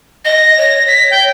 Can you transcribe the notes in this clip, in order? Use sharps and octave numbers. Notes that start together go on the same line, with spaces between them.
D#5 A#6
C#5
C#5 B6
G5